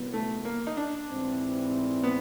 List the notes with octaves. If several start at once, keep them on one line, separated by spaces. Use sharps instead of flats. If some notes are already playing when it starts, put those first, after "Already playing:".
Already playing: C2 A#2 F#3 B3
A3
A#3
D#4
D4
G#2 E3 G3 C4
B3